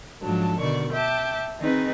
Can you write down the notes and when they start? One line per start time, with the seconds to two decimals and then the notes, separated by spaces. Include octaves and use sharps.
0.21 G#2 F3 F#3 D4 A4
0.59 B2 D3 D#3 D5 C#6
0.92 E5 G5 A5 D6
1.58 D#3 C4 D#4 G#4 B4